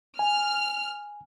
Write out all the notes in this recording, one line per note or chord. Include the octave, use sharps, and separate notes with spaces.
G#5 F6